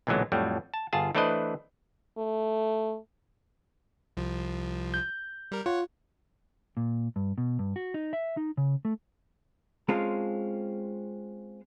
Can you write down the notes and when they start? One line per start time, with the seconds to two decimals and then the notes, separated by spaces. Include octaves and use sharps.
0.07 B1 A#2 D3 E3 F#3 G#3
0.32 F2 A2 F#3 G3
0.74 A5
0.93 G1 F4 G#4 A5
1.15 E3 A3 D4 B4 C5 D#5
2.18 A3
4.17 C2 F3
4.94 G6
5.52 G3 A#4
5.66 F4 C#5 F#5
6.77 A#2
7.16 G2
7.38 B2
7.59 G2
7.76 F#4
7.94 D#4
8.13 E5
8.37 D#4
8.57 C#3
8.85 A3
9.89 G#3 C4 C#4 F4 A4